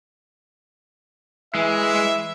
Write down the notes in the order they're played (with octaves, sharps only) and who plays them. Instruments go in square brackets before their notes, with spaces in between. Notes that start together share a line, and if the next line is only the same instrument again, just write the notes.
[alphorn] E3 [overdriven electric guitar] G#3 [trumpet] E5